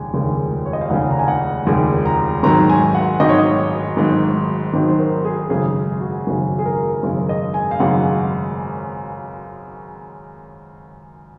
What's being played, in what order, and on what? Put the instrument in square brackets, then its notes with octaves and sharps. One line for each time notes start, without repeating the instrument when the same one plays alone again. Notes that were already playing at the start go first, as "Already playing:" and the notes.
Already playing: [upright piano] F1 D#2 C#3 G#3 G#5
F1 D#2 C#3 G#3
C#5
D#5
F5
F1 D#2 C#3 G#3 F#5
A#5
G#5
F#5
F1 D#2 C#3 G#3
A#5
G#1 G#2 D#3 F#3 A#5
G#5
F#5
G#1 G#2 D#3 F#3 D#5
C#5
D#5
G#1 G#2 D#3 F#3
G#1 G#2 D#3 F#3
C5
A#4
G#4
G#1 F#2 C#3 G#3 G#4
F#4
G#1 F#2 C#3 G#3
G#4
A#4
G#1 F#2 C#3 G#3 A#4
D#5
G#5
F5
G#1 F#2 C#3 G#3 F#5